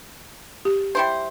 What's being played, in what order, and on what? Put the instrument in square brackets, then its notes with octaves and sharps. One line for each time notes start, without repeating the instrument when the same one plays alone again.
[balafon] G4
[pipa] G3 E4 C5